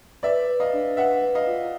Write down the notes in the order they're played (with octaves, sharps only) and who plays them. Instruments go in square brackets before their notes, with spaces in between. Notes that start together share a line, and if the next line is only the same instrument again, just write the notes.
[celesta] B4 [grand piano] D5 E5
[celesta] B4
[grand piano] D#5 F5
[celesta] D4
[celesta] B4 [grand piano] E5 F#5
[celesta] B4
[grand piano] D#5 F5
[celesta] F4